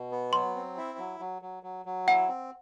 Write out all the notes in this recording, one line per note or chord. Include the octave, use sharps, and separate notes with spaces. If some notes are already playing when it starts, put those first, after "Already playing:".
Already playing: B2
B3
F#3 C6
C4
E4
F#3
F#3
F#3
F#3
F#3
E4 F#5
C4